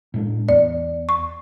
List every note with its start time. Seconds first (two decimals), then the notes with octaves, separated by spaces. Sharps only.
0.14 A2 G#3 D4
0.49 E2 D5
1.09 C#6